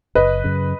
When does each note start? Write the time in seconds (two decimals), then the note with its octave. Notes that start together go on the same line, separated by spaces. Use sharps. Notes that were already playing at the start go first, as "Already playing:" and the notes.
0.15 F#1 B4 D#5
0.44 F#2 C#3